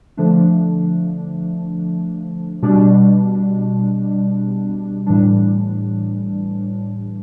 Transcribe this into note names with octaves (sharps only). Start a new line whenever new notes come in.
D3 F3 A3 D4
B2 G3 D4
A2 E3 G3 D4